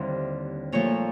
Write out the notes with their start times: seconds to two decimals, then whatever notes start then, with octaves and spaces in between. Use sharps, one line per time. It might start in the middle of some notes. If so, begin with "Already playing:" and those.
Already playing: D#2 D3 G3 C4 E4 C5
0.72 A#2 F3 A3 C#5